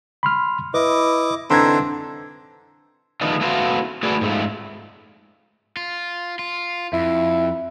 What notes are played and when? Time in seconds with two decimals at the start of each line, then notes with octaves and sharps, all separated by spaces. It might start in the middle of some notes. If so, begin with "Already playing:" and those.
0.23 B5 C6 F6
0.74 E4 B4 D#5 D6
1.51 D3 E3 C4 D#4 A4 A#5 C6 G#6
3.21 D#3 F3 A3 B3 D4 D#4
3.41 A3 B3 E4 F#4 C5 F5
4.03 A3 E4 F#4 G#4 B4 D5
4.21 G#2 A3 F4
5.77 F4
6.39 F4
6.93 F2 E4